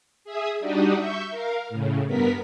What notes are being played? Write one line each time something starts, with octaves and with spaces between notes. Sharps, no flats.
G#4 E5 D#6
G3 D4 D#4 F#4 G4 D#5
E5 C#6 G6
A#4 F5
A2 C#3
G2 B3 A#4 B6